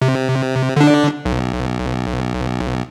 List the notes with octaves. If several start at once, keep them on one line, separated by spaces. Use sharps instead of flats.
C3
D3 D4
B1